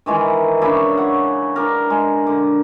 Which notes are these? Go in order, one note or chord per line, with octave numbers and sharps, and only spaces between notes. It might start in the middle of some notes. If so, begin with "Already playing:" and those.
D#3 E3 G#3
C#3 D4 E5 B5
C#5 F#5
D4 A#4
G#3
D3